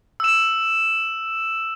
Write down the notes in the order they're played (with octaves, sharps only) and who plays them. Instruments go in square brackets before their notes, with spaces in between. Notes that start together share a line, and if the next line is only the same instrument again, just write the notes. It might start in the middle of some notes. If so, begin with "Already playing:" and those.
[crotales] E6 E7